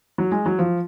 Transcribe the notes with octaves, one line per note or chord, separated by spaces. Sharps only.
F#3
G#3
F#3
F3